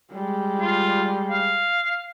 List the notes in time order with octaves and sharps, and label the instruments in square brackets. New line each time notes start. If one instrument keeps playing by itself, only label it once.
[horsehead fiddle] G3 G#3
[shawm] F4
F5